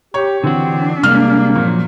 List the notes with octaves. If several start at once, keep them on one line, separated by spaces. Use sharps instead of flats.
G4 C#5
D3 E3 C4 D4 F#4
C3 G3 G#3 A#3 F6
A#2 F3 F#3